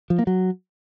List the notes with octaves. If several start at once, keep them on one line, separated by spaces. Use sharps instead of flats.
F3
A#3
F#3